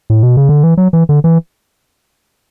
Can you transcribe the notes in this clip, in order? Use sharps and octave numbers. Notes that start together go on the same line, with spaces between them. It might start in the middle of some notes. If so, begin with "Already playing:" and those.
A2
B2
C#3
D3
E3
F#3
E3
D3
E3